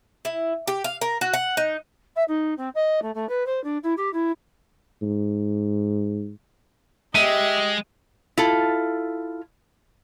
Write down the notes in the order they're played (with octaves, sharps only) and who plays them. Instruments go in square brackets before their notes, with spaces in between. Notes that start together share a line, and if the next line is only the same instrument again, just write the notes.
[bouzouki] E4
G4
F5
A#4
F#4
F#5
D#4
[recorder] E5
D#4
C4
D#5
A3
A3
B4
C5
D4
E4
G4
E4
[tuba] G#2
[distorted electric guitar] G#3 [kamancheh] G4 D#5 [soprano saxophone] E5 [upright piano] D#7
[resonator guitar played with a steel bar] E4 F4 A4